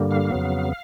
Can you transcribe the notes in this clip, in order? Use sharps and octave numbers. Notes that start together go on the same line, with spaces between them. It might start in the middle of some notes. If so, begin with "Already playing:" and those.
Already playing: G2 D3 G3 A#3
F5
F2 C#3 F#3 B3